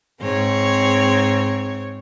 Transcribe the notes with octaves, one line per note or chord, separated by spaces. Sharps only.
G#2 C4 C#5